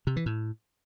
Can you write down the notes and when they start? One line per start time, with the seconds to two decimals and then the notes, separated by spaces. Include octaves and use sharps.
0.07 C3
0.16 E3
0.26 A2